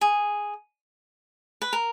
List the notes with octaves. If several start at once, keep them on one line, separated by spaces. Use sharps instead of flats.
G#4
B4
A#4